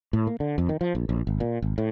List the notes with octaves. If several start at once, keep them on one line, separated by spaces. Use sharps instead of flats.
A2
A#3
D3
F2
D#3
F3
A#1
A#1
G#1
A#2
G#1
A2